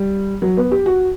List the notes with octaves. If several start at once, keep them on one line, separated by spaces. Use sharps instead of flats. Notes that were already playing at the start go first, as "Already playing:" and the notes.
Already playing: G3
F#3
B3
G4
F#4